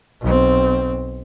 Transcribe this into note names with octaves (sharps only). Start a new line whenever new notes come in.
B1 C4